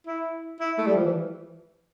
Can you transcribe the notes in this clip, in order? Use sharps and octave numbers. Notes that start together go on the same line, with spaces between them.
E4
E4
A3
G3
F3
E3